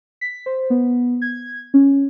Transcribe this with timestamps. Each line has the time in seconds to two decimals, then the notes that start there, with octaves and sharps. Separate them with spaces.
0.21 B6
0.46 C5
0.70 B3
1.22 G#6
1.74 C#4